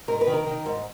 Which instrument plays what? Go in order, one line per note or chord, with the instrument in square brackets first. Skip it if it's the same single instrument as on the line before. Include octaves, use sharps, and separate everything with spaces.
[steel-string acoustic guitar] G#2 A#4
B4
D#3
A#4
D#3
G#2